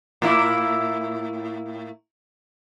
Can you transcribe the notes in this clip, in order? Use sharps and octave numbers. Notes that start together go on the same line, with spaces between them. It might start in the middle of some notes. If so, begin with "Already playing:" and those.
A2 A#3 E4